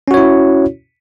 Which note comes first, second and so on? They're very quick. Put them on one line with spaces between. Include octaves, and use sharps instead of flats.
C#4 F#4 C#5 E4